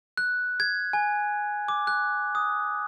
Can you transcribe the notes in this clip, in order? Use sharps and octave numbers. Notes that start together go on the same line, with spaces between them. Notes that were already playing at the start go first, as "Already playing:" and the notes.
F#6
G#6
G#5
D6
F#6
D#6